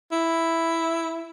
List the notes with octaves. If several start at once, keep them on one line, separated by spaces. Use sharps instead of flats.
E4